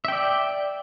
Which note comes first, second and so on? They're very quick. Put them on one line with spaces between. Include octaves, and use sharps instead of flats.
E5 G5 D5